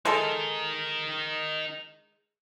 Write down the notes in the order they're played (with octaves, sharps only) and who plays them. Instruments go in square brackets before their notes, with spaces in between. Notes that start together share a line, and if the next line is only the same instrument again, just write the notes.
[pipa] G#3 A4 A5 [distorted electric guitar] D#4 A#4